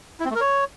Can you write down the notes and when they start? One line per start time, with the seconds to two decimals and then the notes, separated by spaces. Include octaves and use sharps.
0.20 E4
0.25 C4
0.30 A3
0.36 A#4
0.41 C#5